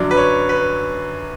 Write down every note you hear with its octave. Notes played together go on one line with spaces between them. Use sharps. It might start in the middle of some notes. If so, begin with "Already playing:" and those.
Already playing: F#2 D3 F#3 D5
B4
C#5
B4